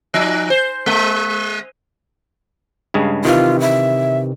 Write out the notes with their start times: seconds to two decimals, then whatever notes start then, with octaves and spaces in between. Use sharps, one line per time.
0.14 F3 D#4
0.50 C5
0.86 G#3
2.94 G2 C#3 G#3
3.25 C3 D#3 E3 F4
3.60 E5